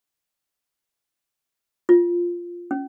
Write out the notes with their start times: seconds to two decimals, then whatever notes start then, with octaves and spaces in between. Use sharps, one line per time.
1.89 F4
2.71 C#4